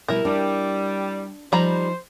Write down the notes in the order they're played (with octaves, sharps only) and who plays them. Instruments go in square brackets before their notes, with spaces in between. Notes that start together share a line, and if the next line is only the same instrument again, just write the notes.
[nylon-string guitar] B2 G3 B4 [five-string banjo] E4 A#4
[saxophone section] G3 [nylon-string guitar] D4
[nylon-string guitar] F3 D#4 [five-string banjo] G3 A#5 B5 [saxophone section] C5